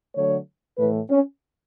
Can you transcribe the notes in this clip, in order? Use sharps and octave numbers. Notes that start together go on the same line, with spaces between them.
D3 F#3 A3 C#5
A2 E3 A3 B4
C#4